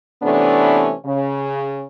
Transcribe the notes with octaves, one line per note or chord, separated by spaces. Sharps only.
C3 E3 A3 B3 C#4 D4
C#3